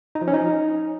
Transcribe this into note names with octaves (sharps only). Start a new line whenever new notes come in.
D#4
F3
C#4
D#4